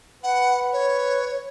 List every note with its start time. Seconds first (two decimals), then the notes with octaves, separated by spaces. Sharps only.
0.23 B4 F#5
0.73 C#5